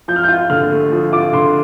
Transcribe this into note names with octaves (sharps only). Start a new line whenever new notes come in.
F3 G6
F6
G6
F4
D3 F6
A3
F3
F4 D6
D3 C6